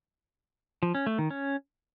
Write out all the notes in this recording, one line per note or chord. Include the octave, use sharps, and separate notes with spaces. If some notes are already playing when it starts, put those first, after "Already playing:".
F3
C#4
A3
D#3
C#4